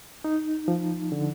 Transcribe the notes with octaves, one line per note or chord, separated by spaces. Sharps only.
D#4
F3
D3